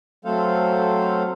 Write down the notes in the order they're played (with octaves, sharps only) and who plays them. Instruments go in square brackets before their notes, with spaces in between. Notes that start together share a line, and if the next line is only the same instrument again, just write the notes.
[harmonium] F#3 A3 C4 A4 C5 F5